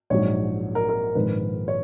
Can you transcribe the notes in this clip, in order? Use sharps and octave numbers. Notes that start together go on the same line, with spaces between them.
A#1 G#2 F#3 C#5
A#4
A#4
A#1 G#2 D#3 B4
C#5